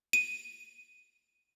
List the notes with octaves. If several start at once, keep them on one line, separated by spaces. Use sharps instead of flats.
D#7